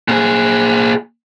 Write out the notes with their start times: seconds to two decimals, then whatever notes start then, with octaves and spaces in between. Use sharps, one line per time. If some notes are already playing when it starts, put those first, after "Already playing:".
0.08 A#2 G#4